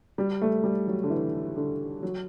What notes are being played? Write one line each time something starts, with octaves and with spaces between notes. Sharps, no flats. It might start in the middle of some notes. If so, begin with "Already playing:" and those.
G3
A3
G3
F#3
D3
E3
D3
F#3